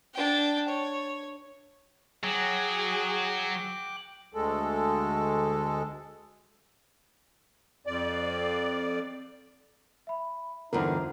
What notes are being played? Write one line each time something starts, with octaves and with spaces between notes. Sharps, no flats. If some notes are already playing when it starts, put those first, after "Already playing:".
D4 G5
C#5
F#3 G#4 G5 D6 F#6
D2 G#3 A4
F2 D5
E5 B5
E2 G2 D3 D#4 F4 A#4 C5 A#5